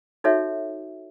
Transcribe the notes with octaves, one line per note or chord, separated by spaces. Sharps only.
D#4 F#4 A4 C#5 E5